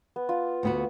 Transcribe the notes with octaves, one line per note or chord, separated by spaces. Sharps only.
B3
F4
D2 B3 F#4